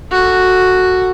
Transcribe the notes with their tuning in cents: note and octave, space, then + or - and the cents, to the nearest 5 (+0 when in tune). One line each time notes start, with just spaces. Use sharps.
F#4 +0 A4 +15